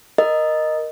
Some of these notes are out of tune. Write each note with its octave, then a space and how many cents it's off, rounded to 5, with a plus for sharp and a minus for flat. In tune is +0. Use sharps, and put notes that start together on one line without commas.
A#4 +10 D#5 -10